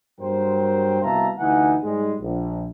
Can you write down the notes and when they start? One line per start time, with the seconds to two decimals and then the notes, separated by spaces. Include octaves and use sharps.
0.20 G2 F#3 A#3 A#4 C5 G5
1.02 C2 B2 E5 F5 A5 A#5
1.39 D2 E3 D#4 F#5 G#5
1.83 G#2 G3 G#3
2.21 A#1